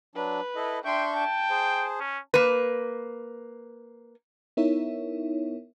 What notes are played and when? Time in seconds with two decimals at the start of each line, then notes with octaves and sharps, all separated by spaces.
0.15 F#3 D4 B4
0.56 E4 A4 D#5
0.85 D4 E5 G5 C6 C#6 G6
1.17 G5 A5
1.50 G#4 C5
2.00 C#4
2.34 A#3 B4
4.57 B3 D#4 E4 A#4 C#5 E5